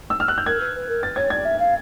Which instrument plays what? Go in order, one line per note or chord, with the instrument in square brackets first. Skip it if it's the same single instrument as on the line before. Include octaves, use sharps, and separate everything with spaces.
[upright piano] E6
F6
F#6
G6
[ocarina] A#4 [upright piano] G#6
[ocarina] B4
B4
A#4
[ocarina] B4 [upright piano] A6
[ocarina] C#5 [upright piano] G#6
[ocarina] D5 [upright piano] G#6
[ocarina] E5
F5